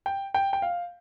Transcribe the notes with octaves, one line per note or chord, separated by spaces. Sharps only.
G5
G5
G5
F5